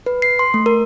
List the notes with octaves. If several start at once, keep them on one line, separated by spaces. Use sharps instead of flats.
B4
C7
C6
A3
A#4